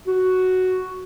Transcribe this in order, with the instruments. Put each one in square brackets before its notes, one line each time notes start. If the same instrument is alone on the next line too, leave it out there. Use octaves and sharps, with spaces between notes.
[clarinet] F#4